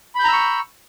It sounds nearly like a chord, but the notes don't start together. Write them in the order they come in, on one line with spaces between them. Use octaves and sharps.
B5 G6 A#5 E6 C#6